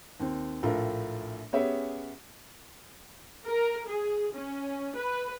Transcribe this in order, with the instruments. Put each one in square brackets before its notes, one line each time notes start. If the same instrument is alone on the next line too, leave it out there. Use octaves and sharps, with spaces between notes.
[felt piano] D#2 C4
A#1 A2 F4 A4 A#4 A#5
B3 C#4 G4 G#4 C#5 E5
[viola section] A#4
G#4
C#4
B4